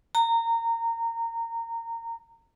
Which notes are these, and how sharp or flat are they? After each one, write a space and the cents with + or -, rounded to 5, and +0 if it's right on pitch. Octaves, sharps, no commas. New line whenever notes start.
A#5 -20